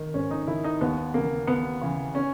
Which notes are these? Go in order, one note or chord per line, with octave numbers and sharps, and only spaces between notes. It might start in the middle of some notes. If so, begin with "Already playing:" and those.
Already playing: D#3
G#2 C#4
D#4
D#3 E4
D#4
D#2 B3
C#3 E3 A#3
D#2 B3
C#3 E3
C#4